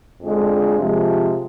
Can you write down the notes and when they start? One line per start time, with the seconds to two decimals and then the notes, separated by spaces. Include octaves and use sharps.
0.22 F2 D3 F3 G#3 D4
0.78 C3 F3 G#3